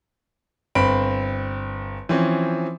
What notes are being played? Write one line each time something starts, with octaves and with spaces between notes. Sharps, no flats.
G1 C4 B5 D7
E3 F3 C4 C#4